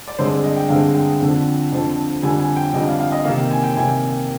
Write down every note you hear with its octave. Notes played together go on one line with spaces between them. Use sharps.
D5
G2 D3 G#3 C4 C5
D5
D#5
G5
G2 D3 G#3 C4 F5
G5
F2 D3 F3 C4
F2 D3 F3 C4
F2 D3 G3 G#5
G#5
G5
F2 D3 G3 D#5
F5
F5
D#5
C3 D#3 A#3 F5
G5
G#5
G5
C3 D#3 A#3 G#5